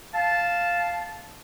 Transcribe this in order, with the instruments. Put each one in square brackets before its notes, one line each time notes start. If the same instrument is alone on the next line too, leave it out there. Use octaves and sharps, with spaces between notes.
[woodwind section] F5 A5